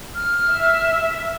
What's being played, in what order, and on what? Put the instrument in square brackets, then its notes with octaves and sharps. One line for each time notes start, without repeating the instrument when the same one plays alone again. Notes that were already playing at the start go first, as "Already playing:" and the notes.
[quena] F6
[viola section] E5